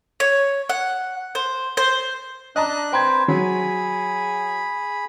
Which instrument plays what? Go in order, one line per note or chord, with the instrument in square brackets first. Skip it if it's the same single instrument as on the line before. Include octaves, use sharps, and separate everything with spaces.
[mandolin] C#5
F#5
C5
C5
[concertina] D4 F#6 [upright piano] D#5 A5 A#5
[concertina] C4 B4 C5 [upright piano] G5 A#5 G#6
[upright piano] F#3 [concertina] G#4 B5